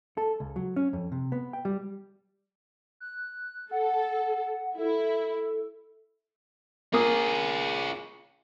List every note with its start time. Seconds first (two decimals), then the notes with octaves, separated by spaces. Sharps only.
0.17 A4
0.40 C#2
0.56 F#3
0.76 C#4
0.93 F2
1.12 C3
1.32 B3
1.53 G5
1.65 G3
3.00 F#6
3.71 A4 F#5
4.78 E4 A4
6.93 A#3 F4 G#4 D#6